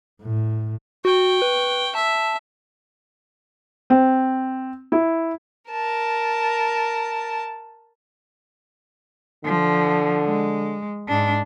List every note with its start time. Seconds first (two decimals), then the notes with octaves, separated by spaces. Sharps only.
0.22 A2
1.05 F#4 G5 C#6
1.42 B4
1.95 E5 A5
3.90 C4
4.92 E4
5.70 A#4 A5
9.45 D3 F3
10.25 G#3
11.08 G#2 D4